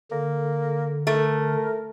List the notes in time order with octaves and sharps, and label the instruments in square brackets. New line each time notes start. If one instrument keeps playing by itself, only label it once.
[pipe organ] D3 [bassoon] A#3
[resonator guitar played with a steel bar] A3 [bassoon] A#4